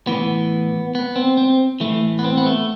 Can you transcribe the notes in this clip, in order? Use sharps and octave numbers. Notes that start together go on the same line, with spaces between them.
A2 E3 B3
B3
C4
C4
A2 E3 A3
B3
C4
B3
A3